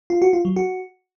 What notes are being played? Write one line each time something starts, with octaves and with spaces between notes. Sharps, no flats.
F4
F#4
F4
F#3
F#4